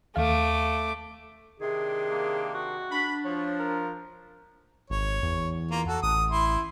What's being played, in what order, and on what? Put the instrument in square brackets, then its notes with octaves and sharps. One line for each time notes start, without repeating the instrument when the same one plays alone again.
[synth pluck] D#2 F5 [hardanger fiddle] A3 D6
[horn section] C3 D#3 D4 [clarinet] G#4
[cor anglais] A#3
F#4
[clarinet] D4 [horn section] B5
[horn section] F3 [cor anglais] C#5
[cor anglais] A#4
[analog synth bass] G#1 [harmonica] C#5
[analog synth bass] E2
[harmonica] A#3 F4
F#4 A4
[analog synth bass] A1 [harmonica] D#6
[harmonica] E4 C6